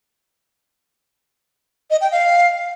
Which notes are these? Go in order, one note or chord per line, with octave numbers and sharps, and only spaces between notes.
D#5
G5
F5